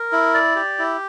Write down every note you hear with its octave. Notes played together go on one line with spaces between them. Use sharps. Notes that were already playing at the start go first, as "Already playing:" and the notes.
Already playing: A#4
E4
D5
G4
E4